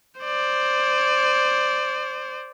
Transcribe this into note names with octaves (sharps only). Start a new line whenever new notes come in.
C5 D5